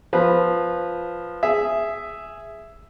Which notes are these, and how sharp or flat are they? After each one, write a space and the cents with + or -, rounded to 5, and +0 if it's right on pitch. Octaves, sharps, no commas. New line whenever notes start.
F3 +0 B4 -5
G#4 +0 E5 +5